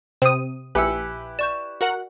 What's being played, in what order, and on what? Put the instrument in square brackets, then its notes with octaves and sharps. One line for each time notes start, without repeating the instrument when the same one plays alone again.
[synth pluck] C3 [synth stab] C4 D#6
[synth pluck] A#1 C#7 [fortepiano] E4 G4 B4 [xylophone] G#5 E6
[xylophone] D5 C#6 G6 [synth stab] E7
[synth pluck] F#4 A#4 F#5